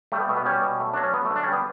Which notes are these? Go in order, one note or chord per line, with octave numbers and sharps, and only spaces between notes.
G3 A3
B3
B2 A3
B3
G3 C#4
B2
A3
F#3 D4
C#4
F#3 B3
A3
D3
D4
G3 C#4
B3